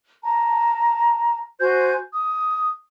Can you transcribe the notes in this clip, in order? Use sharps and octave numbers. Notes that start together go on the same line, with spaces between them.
A5 A#5
F#4 C5 G#5 G6
D#6